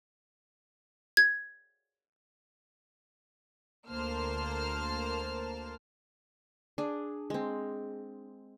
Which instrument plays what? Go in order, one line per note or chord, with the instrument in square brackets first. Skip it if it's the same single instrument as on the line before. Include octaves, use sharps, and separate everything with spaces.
[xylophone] G#6
[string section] D2 A#3 C5 A5 F6
[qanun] D4 G#4
G#3 C4